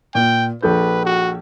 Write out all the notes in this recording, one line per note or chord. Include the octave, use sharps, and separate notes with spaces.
A#2 G5
A#1 A4 B4 G6
F#4